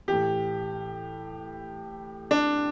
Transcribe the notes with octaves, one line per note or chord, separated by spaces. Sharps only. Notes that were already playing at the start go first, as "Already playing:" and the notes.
A2 E3 G4
D4